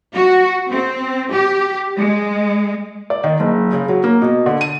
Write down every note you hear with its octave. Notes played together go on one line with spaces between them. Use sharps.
F#4
C4
G4
G#3
D5
D#3
F#1
C#3
F#3
A#3
B2
D3
D#7